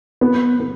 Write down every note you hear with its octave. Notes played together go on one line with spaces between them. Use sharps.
B3
B3